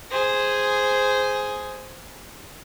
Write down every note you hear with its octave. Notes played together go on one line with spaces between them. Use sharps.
G#4 C5